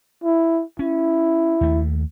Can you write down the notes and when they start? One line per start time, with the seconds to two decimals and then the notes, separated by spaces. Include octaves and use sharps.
0.24 E4
0.79 C#4 E4
1.61 D#2 A3